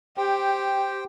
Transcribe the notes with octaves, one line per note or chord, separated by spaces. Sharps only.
G4 C5 G5